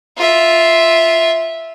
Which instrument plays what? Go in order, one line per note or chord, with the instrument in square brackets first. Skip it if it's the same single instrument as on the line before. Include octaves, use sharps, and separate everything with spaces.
[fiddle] F4 E5